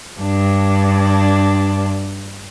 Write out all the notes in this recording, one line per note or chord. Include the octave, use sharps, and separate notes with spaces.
G2 D4